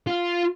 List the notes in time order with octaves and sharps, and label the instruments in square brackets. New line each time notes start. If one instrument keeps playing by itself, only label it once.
[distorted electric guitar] F4